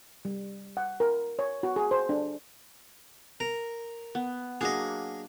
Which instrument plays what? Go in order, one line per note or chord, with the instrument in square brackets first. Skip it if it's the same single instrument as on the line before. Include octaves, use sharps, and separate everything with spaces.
[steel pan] G3
F#5
A#4
C#5
F#4
G#4
C5
D4
[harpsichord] A#4
[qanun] B3
[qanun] F#3 A#3 D4 [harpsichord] G#4 D#5